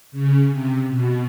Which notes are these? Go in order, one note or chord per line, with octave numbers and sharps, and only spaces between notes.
C#3
C3
B2